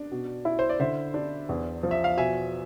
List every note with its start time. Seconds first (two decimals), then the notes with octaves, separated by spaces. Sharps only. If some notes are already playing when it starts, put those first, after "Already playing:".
Already playing: D4
0.11 B2
0.45 E4
0.59 C5
0.69 D5
0.80 D3 C5 E5
1.14 D4
1.49 E2
1.83 F3
1.91 E5
2.04 F5
2.17 B2 E5 G#5